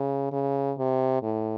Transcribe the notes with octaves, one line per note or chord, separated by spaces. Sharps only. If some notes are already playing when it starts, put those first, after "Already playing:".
Already playing: C#3
C#3
C3
A2